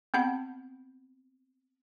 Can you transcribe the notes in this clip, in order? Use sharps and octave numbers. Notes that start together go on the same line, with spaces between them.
B3 C4 F#5 B5